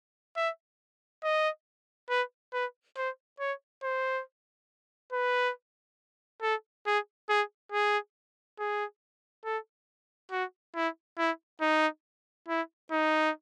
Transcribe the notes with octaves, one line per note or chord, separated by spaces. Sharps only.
E5
D#5
B4
B4
C5
C#5
C5
B4
A4
G#4
G#4
G#4
G#4
A4
F#4
E4
E4
D#4
E4
D#4